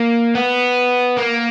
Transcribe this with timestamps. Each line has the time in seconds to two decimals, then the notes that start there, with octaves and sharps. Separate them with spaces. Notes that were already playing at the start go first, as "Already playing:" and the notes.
Already playing: A#3
0.35 B3
1.17 A#3